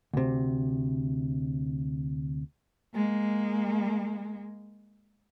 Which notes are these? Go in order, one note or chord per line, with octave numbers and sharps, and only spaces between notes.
D2 C3
G#3 A#3